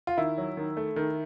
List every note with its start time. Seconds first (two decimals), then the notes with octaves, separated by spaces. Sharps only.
0.07 F4
0.18 D#3 E4
0.38 F#3
0.57 D#3
0.77 A3
0.96 D#3